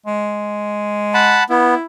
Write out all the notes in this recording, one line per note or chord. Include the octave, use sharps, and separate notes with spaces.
G#3
F#5 A5 B5
B3 E4